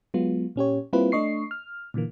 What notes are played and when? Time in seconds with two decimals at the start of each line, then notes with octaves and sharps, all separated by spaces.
0.14 F#3 G#3 B3 F4
0.56 A#2 C#4 G4 C#5
0.93 G3 A#3 C4 E4 F4 B4
1.12 A3 D4 D#5 C#6 C7
1.51 F6
1.94 A#2 D3 E3 A#3